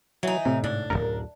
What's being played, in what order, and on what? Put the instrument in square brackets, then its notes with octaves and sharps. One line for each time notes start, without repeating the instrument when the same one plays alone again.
[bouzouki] E3 D#4 [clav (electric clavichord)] F#3
[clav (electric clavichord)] A2 [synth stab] C3
[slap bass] G#2 [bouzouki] D4
[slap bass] D1 G#1 F#2 [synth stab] A#4